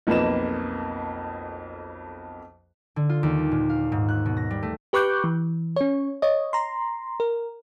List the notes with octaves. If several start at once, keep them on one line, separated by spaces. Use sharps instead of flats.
B1 F2 A#3 B4 D#5 E7
D3
F4
D#2
G3
A#2
F5
G#2
F#6
B2
A#6
G3
A3
G4 B4 C#6 D6 F#6 G6
E3
C#4 C#5
C#5 D#5
A#5 C6
A#4